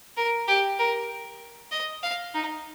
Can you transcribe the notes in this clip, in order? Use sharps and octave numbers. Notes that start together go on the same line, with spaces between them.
A#4
G4
A#4
D#5
F5
D#4